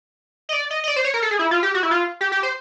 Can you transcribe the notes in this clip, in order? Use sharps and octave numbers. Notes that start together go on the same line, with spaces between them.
D#5
D5
D#5
D#5
D5
C5
C#5
A#4
A4
G#4
E4
F4
G4
F#4
E4
F4
G4
G4
C5